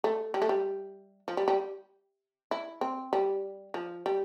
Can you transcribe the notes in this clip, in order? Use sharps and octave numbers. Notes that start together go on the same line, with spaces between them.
A3
G3
A3
G3
F3
G3
G3
E4
C4
G3
F3
G3